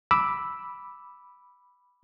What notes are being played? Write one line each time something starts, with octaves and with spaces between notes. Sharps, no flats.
B5 D6 E6